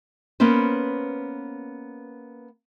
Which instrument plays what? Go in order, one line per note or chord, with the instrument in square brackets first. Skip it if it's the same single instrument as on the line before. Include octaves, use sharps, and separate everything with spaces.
[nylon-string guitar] A#3 B3 C#4 B4 C5